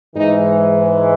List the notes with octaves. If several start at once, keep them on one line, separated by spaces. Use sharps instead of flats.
G#2 E3 G#3 D#4